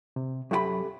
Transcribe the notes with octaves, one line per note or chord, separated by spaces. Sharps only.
C3
F#2 F#4 G4 A4 E5 B5